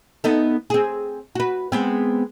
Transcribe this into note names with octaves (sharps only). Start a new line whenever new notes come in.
B3 D#4 A4
C4 G#4
F#4 B4
G#3 B3 C4